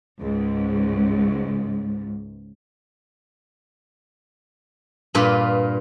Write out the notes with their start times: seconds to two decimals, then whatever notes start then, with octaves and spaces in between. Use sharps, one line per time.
0.20 C#2 G#2
5.15 G2 A#2 F4 B4